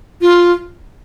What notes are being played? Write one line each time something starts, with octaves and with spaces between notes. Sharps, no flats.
F4